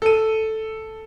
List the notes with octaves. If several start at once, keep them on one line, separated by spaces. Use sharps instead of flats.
A4 D#7